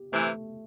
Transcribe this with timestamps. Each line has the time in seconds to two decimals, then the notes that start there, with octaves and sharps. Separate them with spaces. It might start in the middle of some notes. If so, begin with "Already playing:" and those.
Already playing: G4
0.12 C3 E3 A3